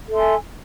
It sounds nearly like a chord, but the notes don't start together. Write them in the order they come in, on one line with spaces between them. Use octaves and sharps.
A4 E5 C6 G#5